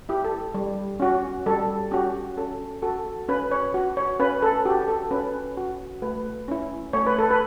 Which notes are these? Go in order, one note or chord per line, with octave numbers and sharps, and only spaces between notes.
E4 G4
A4
G3
C#4 F#4
G3 A4
C#4 F#4 G4
C#4 A4
F#4 A4
C#4 B4
C#5
F#4
C#5
C#4 B4
A4
F#4 G4
A4
C#4 B4
F#4
A3 B4
C#4 E4
A3 C#5
B4
A4
B4